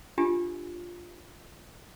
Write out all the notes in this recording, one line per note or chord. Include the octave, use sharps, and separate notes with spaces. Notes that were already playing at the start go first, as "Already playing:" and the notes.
D4 F4 G4 G#5